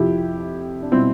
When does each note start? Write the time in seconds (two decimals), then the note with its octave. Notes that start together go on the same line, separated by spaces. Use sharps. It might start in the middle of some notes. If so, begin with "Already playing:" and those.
Already playing: F2 C3 F3 E4 G4
0.82 D4
0.92 B2 G3 C4 E4